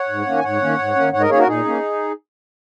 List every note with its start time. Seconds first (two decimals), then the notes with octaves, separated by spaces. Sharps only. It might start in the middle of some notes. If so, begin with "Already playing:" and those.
Already playing: C#5 F#5
0.09 G#2
0.26 D#3 A#3 C#4
0.37 G#5
0.44 G#2 C#5 F#5
0.61 D#3 A#3 C#4
0.79 G#2
0.95 D#3 A#3 C#4
1.12 G#2 C#5 F#5
1.21 A#4 D#5
1.30 D#3 A#3 C#4 G#4 C#5
1.38 F#4 A#4
1.47 A#2 D#4 G#4
1.65 A#3 C#4